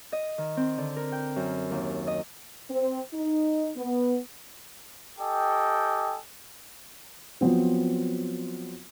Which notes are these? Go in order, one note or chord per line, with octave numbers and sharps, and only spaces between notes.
D#5
D#3
C4
D3
A#4
G5
F#2
D#2
D#5
C4
D#4
B3
G4 A4 D#5 G5 G#5
F3 F#3 B3 C4